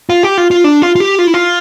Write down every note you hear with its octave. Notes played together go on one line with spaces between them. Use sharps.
F4
G4
F4
F4
D4
F4
F4
G4
F4
E4
F4